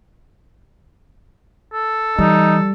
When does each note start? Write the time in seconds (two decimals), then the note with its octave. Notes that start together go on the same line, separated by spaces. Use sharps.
1.73 A4
2.19 E3 G3 D#4